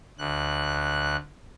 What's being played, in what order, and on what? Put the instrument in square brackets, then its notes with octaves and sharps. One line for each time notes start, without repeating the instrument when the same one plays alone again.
[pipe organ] D2 F#6